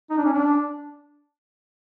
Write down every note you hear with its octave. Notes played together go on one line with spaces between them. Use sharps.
D#4
D4
C#4
D4